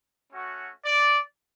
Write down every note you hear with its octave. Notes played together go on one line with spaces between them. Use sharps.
A3 C#4 F#4
D5